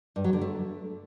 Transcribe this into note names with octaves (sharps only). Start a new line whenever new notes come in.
G2
F#3
D3
A3